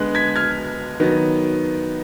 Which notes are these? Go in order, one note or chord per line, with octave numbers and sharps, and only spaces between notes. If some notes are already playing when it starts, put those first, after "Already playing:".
Already playing: D3 G#3 B3 F#6
G#6 B6
F6 G#6
D#3 F#3 B3